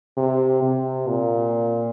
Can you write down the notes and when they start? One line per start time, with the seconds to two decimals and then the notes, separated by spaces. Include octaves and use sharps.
0.18 C3
0.63 C3
1.09 A#2